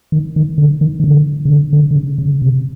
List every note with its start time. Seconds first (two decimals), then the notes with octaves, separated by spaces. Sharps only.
0.12 D#3
0.36 D#3
0.58 D3
0.81 D#3
1.00 D#3
1.04 D3
1.45 C#3
1.50 D3
1.73 D3
1.91 D3
1.96 C#3
2.18 C#3
2.42 C3